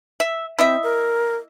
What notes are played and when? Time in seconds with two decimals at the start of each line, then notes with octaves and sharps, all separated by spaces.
0.20 E5
0.59 C4 E4 D#5 E5
0.83 A#4